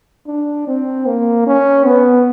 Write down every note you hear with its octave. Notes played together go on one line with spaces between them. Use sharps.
D4
C4
A#3
C#4
B3